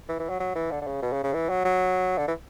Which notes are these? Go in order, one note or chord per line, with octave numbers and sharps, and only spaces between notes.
E3
E3
F#3
F#3
E3
D3
D3
C#3
B2
C#3
C#3
E3
F#3
F#3
D3
E3